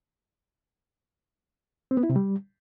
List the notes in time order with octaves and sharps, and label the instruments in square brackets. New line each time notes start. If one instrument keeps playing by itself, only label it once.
[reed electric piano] C4
B3
E4
C3
G3